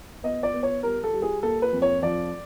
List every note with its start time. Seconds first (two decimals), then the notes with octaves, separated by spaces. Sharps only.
0.23 B3 D#5
0.43 D5
0.53 B3
0.63 C#5
0.83 G3 A#4
1.04 A4
1.14 G3
1.22 G#4
1.43 A#3 A4
1.62 B4
1.73 F2
1.82 C#5
2.02 F3 D5